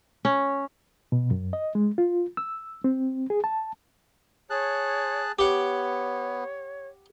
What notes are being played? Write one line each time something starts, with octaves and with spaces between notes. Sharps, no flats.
C#4
B2
F#2
D#5
G#3
F4
E6
C4
G#4
A5
G#4 C#5 A5 F#6
B3 G4 C#5 F#5